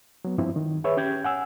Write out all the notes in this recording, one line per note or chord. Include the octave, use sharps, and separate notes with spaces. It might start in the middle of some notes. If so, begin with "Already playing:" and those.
F#3 B3
G2 F3 C4 E4
D#3
G#4 B4 C#5 E5
C#4 G4 G6 G#6
F#5 G#5 E6